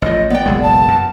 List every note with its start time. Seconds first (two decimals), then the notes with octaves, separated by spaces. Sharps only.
0.02 A1 F3 D#5
0.30 B3 D5 G5
0.46 F#1 B1 G#3
0.63 A5
0.88 F#2